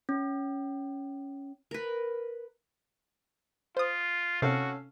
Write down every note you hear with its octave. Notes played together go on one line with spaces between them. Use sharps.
C#4
A#4 B4
F4 C5 D#6
C3 C4 C#4 F#4 A4 F5